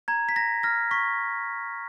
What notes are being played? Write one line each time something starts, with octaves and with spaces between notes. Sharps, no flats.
A#5 G#6
B6
A#5 A#6
F6 A#6
C#6 B6